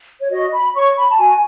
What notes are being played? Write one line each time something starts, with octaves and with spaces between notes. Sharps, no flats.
C#5
F#4 D#5
B5
C#5 C#6
B5
A5
F#4 G#5